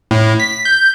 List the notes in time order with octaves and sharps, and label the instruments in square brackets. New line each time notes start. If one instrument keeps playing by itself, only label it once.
[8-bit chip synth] A2
B6
G6